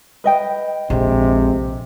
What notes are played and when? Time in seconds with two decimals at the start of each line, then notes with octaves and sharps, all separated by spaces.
0.24 B4 D#5 G5
0.90 A#1 F2 C3 G#3